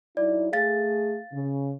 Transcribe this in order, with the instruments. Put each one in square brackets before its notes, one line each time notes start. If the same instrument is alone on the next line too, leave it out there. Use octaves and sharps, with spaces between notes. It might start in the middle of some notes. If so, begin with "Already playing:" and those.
[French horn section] F#3 D#4 E4 [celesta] D5
[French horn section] A3 G#4 [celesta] F5 A6
[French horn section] C#3